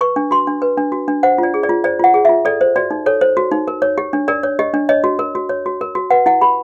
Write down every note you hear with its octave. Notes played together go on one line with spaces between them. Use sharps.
B4 C#6
D4
F#4 C6
D4
B4
D4
F#4
D4
C5 F#5
F4 D5
G#4
D5
F4
C5 D5
F4 F#5
G#4
F4 E5
A4 D5
C5
F#4 D5
D#4
A4 C#5
C5
F#4
D#4
A#4
C#5
G4
D4
A#4 D5
C#5
G4 D#5
D4
C#5 D#5
F#4
A#4
F#4
C#5
F#4
A#4
F#4
B4 F#5
E4 F#5
G4 B5